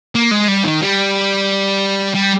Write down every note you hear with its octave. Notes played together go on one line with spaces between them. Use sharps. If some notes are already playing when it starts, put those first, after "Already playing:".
A#3
G#3
G3
D#3
G3
G3